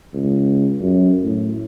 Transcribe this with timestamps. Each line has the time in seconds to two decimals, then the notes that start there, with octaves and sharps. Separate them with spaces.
0.13 C#2
0.81 F#2
1.23 A2